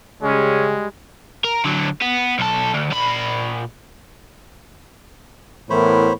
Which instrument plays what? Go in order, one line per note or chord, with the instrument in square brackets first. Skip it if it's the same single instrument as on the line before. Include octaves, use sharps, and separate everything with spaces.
[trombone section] C#3 G#4 [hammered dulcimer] G3 [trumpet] G#3 [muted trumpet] C#4
[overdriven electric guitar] A#4
D3 F#3
B3
B1 A4
D2
A#2 B5
[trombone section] A2 E3 B3 [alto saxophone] A#4 [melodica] C5 C#5 B5